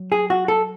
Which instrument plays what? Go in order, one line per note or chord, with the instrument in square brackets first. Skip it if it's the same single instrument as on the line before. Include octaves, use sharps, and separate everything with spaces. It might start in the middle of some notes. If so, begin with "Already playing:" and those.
Already playing: [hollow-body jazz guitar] F#3
G#4
F#4
A4